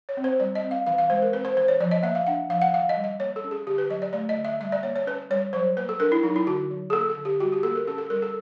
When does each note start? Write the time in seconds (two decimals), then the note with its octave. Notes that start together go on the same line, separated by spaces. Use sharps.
0.09 C#5
0.17 C4
0.24 C5
0.40 G3 D5
0.55 D#5
0.64 C4
0.71 F5
0.87 E3 F5
0.98 F5
1.10 G#3 C5
1.22 A#4
1.33 C4 B4
1.45 C5
1.56 E3 C5
1.68 C#5
1.80 F3 D5
1.91 D#5
2.03 A#3 E5
2.15 F5
2.27 D4 F#5
2.49 F3 F5
2.62 F#5
2.73 D#3 F5
2.89 D#5
2.96 G3
3.04 D#5
3.19 A#3 C#5
3.36 A4
3.44 C#4
3.51 G#4
3.67 D3 G4
3.78 B4
3.90 F#3 D#5
4.02 D5
4.13 A3 D5
4.29 D#5
4.37 D3
4.45 E5
4.60 G3 E5
4.72 D5
4.83 A#3 C#5
4.96 C#5
5.06 C#4 B4
5.30 G3 C#5
5.53 F#3 C5
5.77 A#3 B4
5.89 A4
6.00 D4 A#4
6.12 E4
6.23 F#3 D#4
6.36 E4
6.47 D3 F#4
6.70 F#3
6.90 G#4
6.93 A#3 A4
7.10 A4
7.17 D3
7.25 G4
7.40 G3 F#4
7.52 G4
7.63 A#3 A4
7.75 A#4
7.87 C#4 A4
7.98 A4
8.10 G3 A#4
8.22 A4